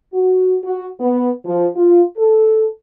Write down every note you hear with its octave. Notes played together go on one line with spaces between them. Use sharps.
F#4
F#4
B3
F3
F4
A4